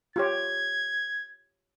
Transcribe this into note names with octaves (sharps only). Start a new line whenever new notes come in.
F4 G4 C#5 G#6